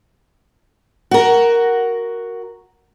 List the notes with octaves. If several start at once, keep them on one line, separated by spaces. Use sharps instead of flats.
F#4 A#4